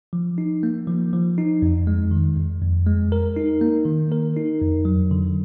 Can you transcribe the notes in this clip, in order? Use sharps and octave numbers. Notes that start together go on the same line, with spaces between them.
F3
D#4
A#3
F3
F3
D#4
F2
G#3
D#3
F2
F2
G#3
A#4
D#4
A#3
D#3
A#4
D#4
F2
F#3
D3